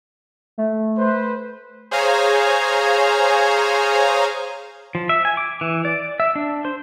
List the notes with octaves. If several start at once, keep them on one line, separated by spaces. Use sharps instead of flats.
A3
B4 C5
G#4 C5 C#5 F5 G#5 A#5
F3
E5
G#5
D6
E3
D5
E5
D4
C5